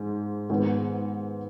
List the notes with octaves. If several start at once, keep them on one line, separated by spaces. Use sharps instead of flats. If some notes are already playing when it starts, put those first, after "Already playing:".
Already playing: G#2
G#2 D#3 B3